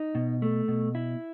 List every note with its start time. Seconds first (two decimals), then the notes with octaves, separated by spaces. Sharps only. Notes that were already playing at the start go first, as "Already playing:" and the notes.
Already playing: D#4
0.15 B2
0.42 A3
0.68 B2
0.95 E4